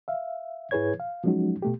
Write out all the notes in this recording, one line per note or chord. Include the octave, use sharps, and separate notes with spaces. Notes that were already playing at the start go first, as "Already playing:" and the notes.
E5 F5
G#2 E4 G#4 B4 C#5 G#6
F5
F3 F#3 G#3 C#4 D#4 F#4
B2 A3 G4